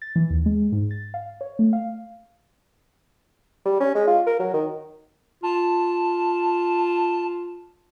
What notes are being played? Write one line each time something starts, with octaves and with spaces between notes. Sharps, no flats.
A6
E3
D#2
G#3
G#2
A6
F5
C#5
A3
F5
G3
C#4
G#3
F4
A#4
F#3
D#3
F4 A5